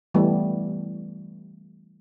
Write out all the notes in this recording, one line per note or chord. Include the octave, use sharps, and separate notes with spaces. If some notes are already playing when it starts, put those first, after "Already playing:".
E3 G3 A3 B3